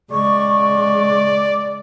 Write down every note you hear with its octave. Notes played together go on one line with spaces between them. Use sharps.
C#3 G#3 D5 C#6